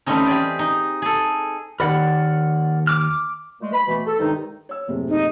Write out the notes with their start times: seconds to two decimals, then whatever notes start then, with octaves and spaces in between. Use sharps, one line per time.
0.06 E3 G3 A3 C4 C#4 D#4
0.26 G4 G#4 D5
0.59 D#4
1.02 G#4 A4
1.80 D#2 A#4 D5 F#5 B5
2.87 D6 F6
3.61 A#2 G#3 A3
3.73 B5
3.87 B2 E3 A3
4.06 A4
4.19 G2 C3 D#3 G#3 D#4
4.69 C#5 E6
4.88 F#1 A2 C3
5.09 D#4